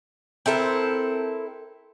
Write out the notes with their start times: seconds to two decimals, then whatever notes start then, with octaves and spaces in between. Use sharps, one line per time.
0.46 C4 E4 A4 A#4